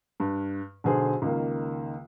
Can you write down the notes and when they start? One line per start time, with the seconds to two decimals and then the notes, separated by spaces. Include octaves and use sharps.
0.20 G2
0.84 B1 D3 G#4 C5
1.22 C#2 D#3 A#3